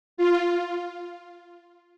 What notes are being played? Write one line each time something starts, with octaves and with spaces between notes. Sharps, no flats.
F4